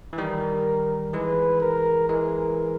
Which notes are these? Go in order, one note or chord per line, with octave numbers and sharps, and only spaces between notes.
E3
D#3 G3 A#4
E3 G#3 B4
A#4
E3 G#3 A#4